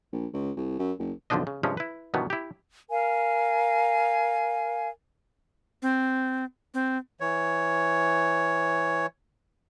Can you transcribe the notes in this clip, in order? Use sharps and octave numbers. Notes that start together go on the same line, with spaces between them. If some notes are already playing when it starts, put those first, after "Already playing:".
A#1
C#2
C2
F#2
F#1
B1 F2 D3 F3 D4 D#5
C#3
G2 C3 F3 G#3 C#4
E4 B4
G2 B2 D#3 E3 F#3 B3
E4 G4
A#4 F5 G#5
C4
C4
E3 C#5